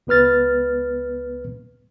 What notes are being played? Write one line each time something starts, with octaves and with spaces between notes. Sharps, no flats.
C#2 B3 B4 F6 A6